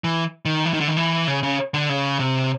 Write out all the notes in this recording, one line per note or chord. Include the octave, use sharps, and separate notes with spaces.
E3
D#3
E3
D#3
D3
D#3
E3
C#3
C#3
D3
C#3
C3